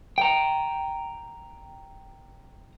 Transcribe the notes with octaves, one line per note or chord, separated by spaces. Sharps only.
G5 A#5